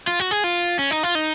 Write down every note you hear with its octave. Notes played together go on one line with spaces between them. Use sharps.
F4
F#4
G#4
F4
C#4
D#4
F4
D#4